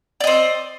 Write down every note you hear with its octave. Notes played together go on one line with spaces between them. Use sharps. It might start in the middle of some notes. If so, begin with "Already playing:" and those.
C4 D5 D#5